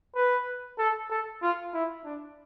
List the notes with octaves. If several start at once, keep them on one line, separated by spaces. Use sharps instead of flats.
B4
A4
A4
F4
E4
D4